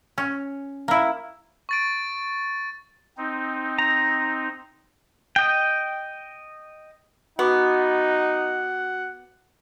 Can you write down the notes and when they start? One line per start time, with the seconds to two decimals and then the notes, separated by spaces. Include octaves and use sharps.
0.18 C#4
0.88 A#3 E4
1.69 C#6 A6 D7
3.17 C4 D#4
3.79 A#5
5.36 D#5 G5
7.39 B3 D#4 F#4 F#5 C#6 D6